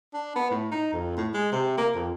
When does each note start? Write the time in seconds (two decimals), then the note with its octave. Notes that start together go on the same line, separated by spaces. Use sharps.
0.14 D4
0.36 B3
0.51 A2
0.72 D#4
0.93 F2
1.17 A2
1.34 G#3
1.52 C3
1.78 A#3
1.95 F2